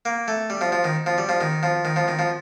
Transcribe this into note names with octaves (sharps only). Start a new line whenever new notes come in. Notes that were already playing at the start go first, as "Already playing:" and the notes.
A#3
A3
G3
F3
F3
D#3
F3
G3
F3
D#3
F3
D#3
F3
D#3
F3